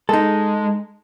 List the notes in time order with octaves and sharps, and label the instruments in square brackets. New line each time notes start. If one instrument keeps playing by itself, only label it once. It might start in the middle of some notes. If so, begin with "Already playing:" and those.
[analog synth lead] G#3 [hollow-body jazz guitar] D#4 A4